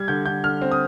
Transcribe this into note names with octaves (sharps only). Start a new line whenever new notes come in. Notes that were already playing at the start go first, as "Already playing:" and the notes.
Already playing: G3 G#6
D3 G6
D3 G6
D3 F6
C4
D#6